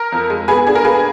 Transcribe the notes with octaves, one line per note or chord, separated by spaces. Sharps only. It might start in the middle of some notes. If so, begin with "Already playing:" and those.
Already playing: A#4
F2
G#3
B3 G#4 B4
D4 G#4
A#4
A#3 G#4 B4